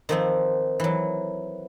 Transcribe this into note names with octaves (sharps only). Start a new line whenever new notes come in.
D#3 F3 C4
E3 F#3